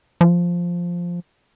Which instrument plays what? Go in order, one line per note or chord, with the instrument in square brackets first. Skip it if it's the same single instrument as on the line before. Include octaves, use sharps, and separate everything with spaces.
[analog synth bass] F3